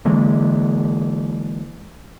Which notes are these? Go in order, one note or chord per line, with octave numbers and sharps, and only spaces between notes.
D3 E3 G#3 A#3